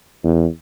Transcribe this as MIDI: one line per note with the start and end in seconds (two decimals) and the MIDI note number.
0.24 0.47 40